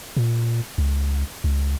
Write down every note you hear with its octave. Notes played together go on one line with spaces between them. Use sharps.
A#2
C#2
C#2